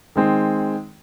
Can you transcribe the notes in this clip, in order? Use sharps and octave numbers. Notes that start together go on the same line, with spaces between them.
D#3 G#3 C4